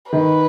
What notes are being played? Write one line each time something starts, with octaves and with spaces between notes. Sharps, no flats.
D#3 B4